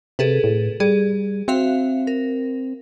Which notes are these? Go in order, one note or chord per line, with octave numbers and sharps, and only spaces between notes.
C3 G#4 A4 B4
A2
G3 G#4
C4 F#4 E5 F5
A#4